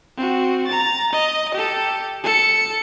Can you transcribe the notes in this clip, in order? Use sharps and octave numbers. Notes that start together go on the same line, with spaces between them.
C4 F#4
A#5 A6
D#5
G4 A4
A4 C#7